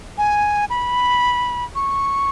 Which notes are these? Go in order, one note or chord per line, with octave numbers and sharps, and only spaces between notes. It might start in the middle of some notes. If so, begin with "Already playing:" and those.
G#5
B5
C#6